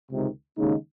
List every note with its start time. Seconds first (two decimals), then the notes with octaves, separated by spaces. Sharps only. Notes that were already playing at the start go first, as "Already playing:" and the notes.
0.11 C#2 C3 D#3
0.58 D#2 C#3 G#3 D#4